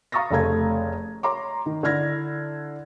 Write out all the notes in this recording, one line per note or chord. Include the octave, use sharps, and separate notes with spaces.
F5 A#5 C#6 D#6 A6 A#6
F1 C#3 A3 A#5 G#6
C#5 A#5 C6 D6
D#3
D3 E4 F6 G#6 A#6